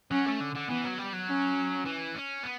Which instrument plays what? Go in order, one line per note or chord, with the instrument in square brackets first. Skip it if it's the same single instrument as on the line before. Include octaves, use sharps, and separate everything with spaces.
[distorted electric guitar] F#3 [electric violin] C#4
[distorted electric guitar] A3
D3
D3
[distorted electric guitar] E3 [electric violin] B3
[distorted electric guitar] F#3
G3
F#3
[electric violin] C#4
[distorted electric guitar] E3
C#4
B3